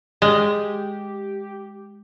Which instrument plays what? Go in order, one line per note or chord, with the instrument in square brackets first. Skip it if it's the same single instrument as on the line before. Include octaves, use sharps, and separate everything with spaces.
[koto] G#3 [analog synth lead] G4